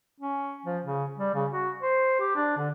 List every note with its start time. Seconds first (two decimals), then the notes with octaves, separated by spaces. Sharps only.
0.21 C#4
0.66 F3
0.84 C#3
1.18 G3
1.34 C#3
1.51 F#4
1.82 C5
2.20 G4
2.36 D4
2.58 D3